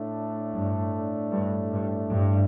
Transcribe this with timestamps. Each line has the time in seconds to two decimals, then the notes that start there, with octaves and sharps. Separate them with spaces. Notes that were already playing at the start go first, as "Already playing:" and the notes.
Already playing: A2 A3 D4
0.53 G2
1.32 G2
1.72 G2
2.11 G2